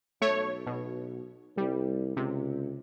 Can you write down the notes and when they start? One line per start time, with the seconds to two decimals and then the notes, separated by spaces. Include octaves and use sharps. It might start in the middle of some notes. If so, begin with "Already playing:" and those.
0.22 B1 A3 C#5
0.66 B2
1.57 C2 G3
2.17 C#2 C3